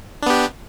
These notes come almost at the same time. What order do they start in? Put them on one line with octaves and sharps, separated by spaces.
D4 B3 G4